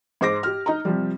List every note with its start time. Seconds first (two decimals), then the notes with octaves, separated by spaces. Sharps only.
0.21 G#2 C5 D6 A#6
0.43 G4 F6
0.66 D#4 D#5 A#5
0.85 C3 F3 G3